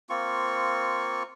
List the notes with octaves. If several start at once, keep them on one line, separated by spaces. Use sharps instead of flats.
A#3 C4 F4 C#6